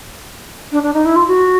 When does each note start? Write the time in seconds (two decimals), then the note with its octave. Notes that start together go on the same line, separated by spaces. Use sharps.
0.72 D4
0.83 D4
0.94 D#4
1.05 E4
1.16 F4
1.27 F#4